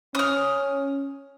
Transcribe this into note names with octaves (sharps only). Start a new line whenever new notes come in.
C#4 D#6 F6